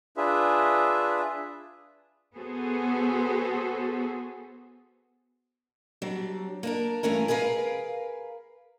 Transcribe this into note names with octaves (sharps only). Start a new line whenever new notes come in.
D4 F4 G#4 B4 E5
B3 F#4 G#4 A4 C5
F#3 G3 C4 D4
A#3 D4 A#4
G2 E3 A3 C#4 A#4
G#4 A#4 B4 D5 F5